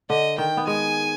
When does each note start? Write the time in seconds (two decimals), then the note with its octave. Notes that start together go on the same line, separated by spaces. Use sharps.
0.09 D3 D#5
0.38 D#3 G5
0.57 B3
0.67 G#3 G#5